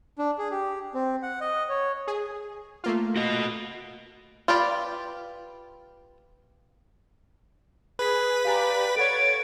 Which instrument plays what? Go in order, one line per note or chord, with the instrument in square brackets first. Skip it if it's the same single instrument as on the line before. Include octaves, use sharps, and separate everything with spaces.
[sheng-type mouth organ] D4
G#4
G4
C4
F#5
D#5
C#5
[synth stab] G#4
A3 A#3 F4
[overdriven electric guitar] F#4 D#5
[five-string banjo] F4 G4 B4 D5
[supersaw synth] G#4 [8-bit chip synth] B4 B6
[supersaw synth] G4 D5 [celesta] F5 G#5 A#5
[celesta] A4 F#5 [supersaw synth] C#5 G#6 A6 [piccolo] D7